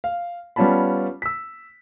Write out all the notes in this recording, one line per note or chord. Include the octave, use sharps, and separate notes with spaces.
F5
G3 B3 C#4 F4 A5 B5
E6 B6